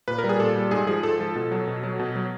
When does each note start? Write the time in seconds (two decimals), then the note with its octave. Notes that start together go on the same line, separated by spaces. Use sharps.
0.08 A#2 B4
0.18 A#4
0.24 G3
0.29 G#4
0.40 A#2 A4
0.56 G3
0.71 G#2 G#4
0.87 F3 G#4
1.03 G#2 A4
1.20 F3
1.36 B2
1.52 F#3
1.67 B2
1.84 F#3
1.99 B2
2.16 F#3